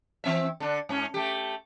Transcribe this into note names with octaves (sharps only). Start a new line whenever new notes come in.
E3 C4 E5
D3 D4
G#2 C#4
A3 G4